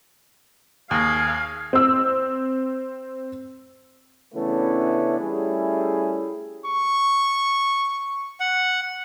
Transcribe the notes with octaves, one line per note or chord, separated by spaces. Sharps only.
D#2 G#4 F5 A#6
C4 E6
C#3 E3 A3 B3 C#4 D4
G3 A3 C#4 E4 G#4
C#6
F#5